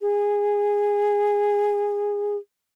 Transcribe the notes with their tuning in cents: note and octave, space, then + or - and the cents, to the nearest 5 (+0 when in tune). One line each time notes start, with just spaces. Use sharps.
G#4 -15